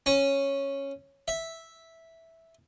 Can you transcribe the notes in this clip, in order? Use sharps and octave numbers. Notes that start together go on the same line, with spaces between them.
C#4
E5